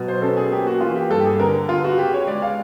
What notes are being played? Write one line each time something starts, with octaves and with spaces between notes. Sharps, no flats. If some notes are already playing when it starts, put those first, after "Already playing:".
Already playing: B2 F#3
C5
C#4 A4
G#4
A#3 G4
F#4
E3 F4
G4
G2 A4
G4
G#4
D3 A#4
B3 F4
F#4
C#3 G4
C#5
G#3 D5
F5